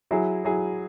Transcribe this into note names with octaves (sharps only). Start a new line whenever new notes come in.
F#3 E4 G#4
F#3 E4 G#4